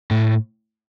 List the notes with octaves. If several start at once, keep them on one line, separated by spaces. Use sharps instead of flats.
A2